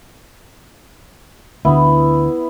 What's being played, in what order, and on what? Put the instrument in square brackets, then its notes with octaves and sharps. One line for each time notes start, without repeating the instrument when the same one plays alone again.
[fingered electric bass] D2 D3 [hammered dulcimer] B3 E4